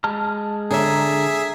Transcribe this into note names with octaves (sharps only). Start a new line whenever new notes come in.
G#3 A5 F6
D3 G#4 C5 C#5 E5 A#5